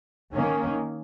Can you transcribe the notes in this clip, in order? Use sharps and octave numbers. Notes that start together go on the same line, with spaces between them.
D#3 A#3 C#4